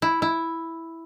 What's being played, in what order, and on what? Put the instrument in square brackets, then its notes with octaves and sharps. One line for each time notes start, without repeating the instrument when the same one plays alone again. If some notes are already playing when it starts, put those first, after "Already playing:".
[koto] E4
E4